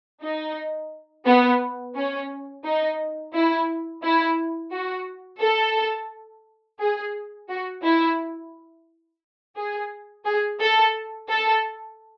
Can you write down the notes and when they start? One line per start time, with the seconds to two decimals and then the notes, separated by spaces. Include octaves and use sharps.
0.22 D#4
1.26 B3
1.95 C#4
2.64 D#4
3.33 E4
4.03 E4
4.72 F#4
5.40 A4
6.80 G#4
7.49 F#4
7.83 E4
9.56 G#4
10.25 G#4
10.60 A4
11.29 A4